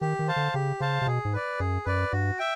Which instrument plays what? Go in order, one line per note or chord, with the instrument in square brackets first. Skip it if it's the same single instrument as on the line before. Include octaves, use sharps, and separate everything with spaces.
[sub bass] D#3 [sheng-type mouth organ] G4
[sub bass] D#3
[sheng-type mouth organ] C5 F5 A5
[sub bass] D3
[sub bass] C#3 [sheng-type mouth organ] G4
[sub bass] C#3 [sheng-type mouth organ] C5 F5 A5
[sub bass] C3
[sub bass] B2 [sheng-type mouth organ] G#4
[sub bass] G#2
[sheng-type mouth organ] B4 D5
[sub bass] F#2 [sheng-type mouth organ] G#4
[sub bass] F#2 [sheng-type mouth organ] B4 D5
[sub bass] G2 [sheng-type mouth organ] F#4
[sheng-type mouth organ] E5 G5